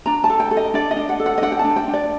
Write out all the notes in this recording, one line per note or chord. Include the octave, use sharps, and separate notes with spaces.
D4 A#5
A5
A4
G5
A4
D#5
D4 D5
D#5
D4
F#5
A4
F#5
D#5
D4 F#5
G5
A5
D4
G5
D4
D5